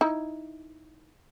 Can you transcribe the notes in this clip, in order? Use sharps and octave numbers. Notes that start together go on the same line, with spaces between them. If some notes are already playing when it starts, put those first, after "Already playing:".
D#4 E4